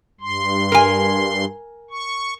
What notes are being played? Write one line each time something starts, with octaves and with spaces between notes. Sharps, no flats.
G2 C6
A#4 G#5
C#6